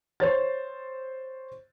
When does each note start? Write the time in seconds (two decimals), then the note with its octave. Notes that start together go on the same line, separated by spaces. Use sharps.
0.20 C5 C#5 A6